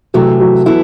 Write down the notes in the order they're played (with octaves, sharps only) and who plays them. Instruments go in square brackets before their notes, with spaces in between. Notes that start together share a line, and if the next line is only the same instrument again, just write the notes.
[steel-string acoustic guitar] C3 E3 A3 [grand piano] F#3
[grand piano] F#3
[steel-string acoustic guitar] E3 B3 E4 A4